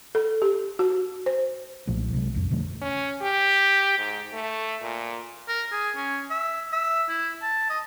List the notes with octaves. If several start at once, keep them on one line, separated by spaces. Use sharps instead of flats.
A4
G4
F#4
C5
B1 A#2 F3 A3
C2 C3 F#3 G#3
A1 F2
B2 D3 F3 A3
C#4
G4
G#2
A3
A#2
A#4
G#4
C#4
E5
E5
E4
A5
D#5